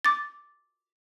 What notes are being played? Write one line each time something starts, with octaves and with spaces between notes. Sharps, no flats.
D6 A6